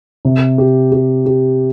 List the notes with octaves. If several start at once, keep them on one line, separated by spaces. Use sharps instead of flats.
C3
G4
G4
G4